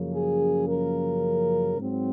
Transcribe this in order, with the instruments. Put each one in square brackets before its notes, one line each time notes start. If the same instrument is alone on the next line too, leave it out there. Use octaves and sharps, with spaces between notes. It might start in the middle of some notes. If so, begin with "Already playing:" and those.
Already playing: [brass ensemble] F#2 C#3 F3 A#3
G#4
A#4
G#2 F#3 C4